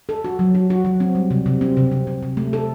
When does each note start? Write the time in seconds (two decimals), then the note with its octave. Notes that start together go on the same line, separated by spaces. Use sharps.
0.09 A4
0.24 F#4
0.39 F#3
0.55 F#4
0.70 F#4
0.85 F#3
1.00 C4
1.15 G3
1.31 C3
1.46 C3
1.61 C4
1.77 C3
1.92 C3
2.07 C3
2.23 C3
2.37 A3
2.53 A4